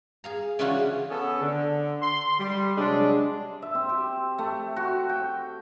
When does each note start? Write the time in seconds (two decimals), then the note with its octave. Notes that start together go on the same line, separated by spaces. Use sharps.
0.24 G#4 F5 A#5
0.59 C#3 E3 C#4 D4 F4 F#4
1.10 B3 C#4 G#4 A4
1.41 D3
2.02 C6
2.40 G3
2.78 C3 F#3 G#3 D4
3.62 E5
3.75 C4
3.89 G4
4.38 A3
4.76 F#4
5.09 G5